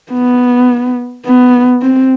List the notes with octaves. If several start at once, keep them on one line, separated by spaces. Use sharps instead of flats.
B3
B3
C4